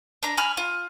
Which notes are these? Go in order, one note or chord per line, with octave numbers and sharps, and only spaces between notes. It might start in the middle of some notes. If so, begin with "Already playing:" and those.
D4 A#5
G#5 B5 F6
F4